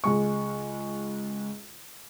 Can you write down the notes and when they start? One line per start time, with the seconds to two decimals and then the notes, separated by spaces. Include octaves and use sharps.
0.04 C#2 G#3 C#6